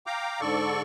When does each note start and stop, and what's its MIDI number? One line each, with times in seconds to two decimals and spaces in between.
0.06 0.41 77
0.06 0.41 79
0.06 0.41 82
0.06 0.41 86
0.41 0.82 44
0.41 0.82 50
0.41 0.82 69
0.41 0.82 74
0.41 0.82 85